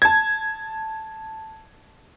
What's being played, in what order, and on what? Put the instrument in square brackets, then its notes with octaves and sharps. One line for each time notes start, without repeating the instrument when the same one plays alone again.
[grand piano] A5 G#6